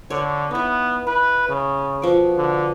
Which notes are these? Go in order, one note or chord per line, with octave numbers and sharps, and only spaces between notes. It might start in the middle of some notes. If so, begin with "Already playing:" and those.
D3 C#5 D5
B3 D#4 E4
E4 B4
C#3
B2 F3 D5
D3